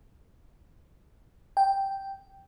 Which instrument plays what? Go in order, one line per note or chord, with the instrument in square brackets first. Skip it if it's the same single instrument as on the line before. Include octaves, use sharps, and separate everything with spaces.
[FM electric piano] G5